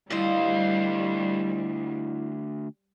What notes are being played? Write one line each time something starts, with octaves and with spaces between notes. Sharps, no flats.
D2 G3 E4 F4 C5 D#5